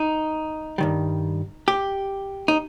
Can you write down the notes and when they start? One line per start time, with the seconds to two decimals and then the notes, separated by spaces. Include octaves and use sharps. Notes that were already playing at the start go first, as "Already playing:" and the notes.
Already playing: D#4
0.78 G2 D#3 G3
1.68 G4
2.48 D#4